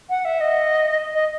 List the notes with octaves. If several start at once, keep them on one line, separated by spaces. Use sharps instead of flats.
F#5
E5
D#5
D#5